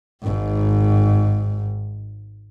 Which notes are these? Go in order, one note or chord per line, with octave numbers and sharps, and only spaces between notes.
G#1 G#2